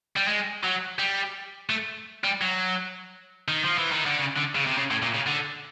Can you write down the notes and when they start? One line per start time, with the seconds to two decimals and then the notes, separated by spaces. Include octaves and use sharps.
0.16 G3
0.27 G#3
0.63 F#3
0.99 G3
1.70 A3
2.24 G3
2.41 F#3
3.48 D#3
3.64 F3
3.78 E3
3.92 D#3
4.06 D3
4.19 C#3
4.37 D3
4.55 C#3
4.66 C3
4.77 C#3
4.91 A2
5.02 A#2
5.15 C#3
5.27 D3